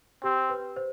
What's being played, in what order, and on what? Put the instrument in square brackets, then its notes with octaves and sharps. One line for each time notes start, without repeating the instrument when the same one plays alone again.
[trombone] C4 [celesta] G4
[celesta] B4
C5